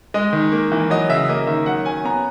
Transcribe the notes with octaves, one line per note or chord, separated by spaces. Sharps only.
G#3 D#5
D#3
A#3
E3
F#3 D#5
C#3 E5
A#3 D#5
D#3 E5
F#3 F#5
C#4 G#5
B3 A#5